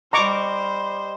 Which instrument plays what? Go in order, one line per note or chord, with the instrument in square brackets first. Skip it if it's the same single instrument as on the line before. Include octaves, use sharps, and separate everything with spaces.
[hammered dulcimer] G3 D#5 [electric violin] C5 [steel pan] A#5 C#6 D6